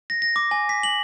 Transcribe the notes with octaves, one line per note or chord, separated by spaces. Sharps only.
A#6
A#6
D6
G#5
B6
F#7